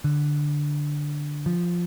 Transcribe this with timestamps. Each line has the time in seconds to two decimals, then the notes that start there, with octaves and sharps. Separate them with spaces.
0.04 D3
1.46 F3